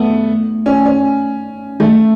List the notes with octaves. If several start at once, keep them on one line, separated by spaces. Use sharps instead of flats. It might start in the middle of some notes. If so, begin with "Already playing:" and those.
Already playing: A3 B3
C#4
C#4
A3